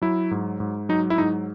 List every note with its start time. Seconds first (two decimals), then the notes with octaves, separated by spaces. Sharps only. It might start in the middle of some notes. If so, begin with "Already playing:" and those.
0.02 F#3 E4
0.31 G#2
0.60 G#2
0.89 F#3 D#4
1.10 E4
1.18 G#2 D#4